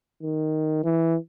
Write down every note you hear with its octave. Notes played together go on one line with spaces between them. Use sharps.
D#3
E3